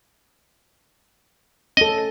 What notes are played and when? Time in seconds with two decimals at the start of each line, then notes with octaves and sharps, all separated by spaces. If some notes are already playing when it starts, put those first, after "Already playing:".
1.77 C#4 A4 D#5